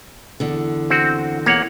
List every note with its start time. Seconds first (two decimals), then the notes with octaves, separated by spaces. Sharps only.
0.40 E2 D3
0.90 C4 F#4
1.46 E2 A#3 C#5 F#5